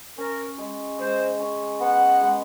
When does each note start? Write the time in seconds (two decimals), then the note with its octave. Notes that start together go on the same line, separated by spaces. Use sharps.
0.18 C#4 A#4
0.58 G#3
0.99 G#3 C5
1.40 C#4
1.80 B3 F#5
2.21 G#3